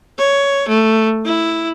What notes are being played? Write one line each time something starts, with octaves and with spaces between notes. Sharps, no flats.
C#5
A3
E4